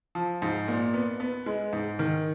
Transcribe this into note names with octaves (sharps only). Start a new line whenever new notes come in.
F3
G#2
A#2
B3
B3
G#3
G#2
D#3